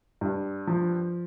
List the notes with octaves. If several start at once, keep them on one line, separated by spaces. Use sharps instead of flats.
G2
F3